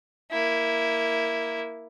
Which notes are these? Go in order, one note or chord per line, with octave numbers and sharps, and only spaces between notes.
A#3 E4